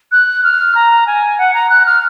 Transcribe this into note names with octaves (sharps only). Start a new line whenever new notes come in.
F#6
F6
A#5
G#5
F#5
A#5
F#6
F6